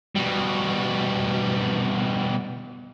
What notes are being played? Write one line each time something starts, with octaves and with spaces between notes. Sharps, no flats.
B2 G3